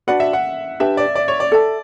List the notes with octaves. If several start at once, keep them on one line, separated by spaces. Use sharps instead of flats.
D4 F#4 B4 D5 F#5
E5
F#5
D4 G4 B4 E5
D5
D5
C#5
D5
A4 E5 A5